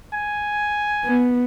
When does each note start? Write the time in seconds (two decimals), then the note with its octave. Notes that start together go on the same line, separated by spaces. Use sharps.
0.14 G#5
1.05 B3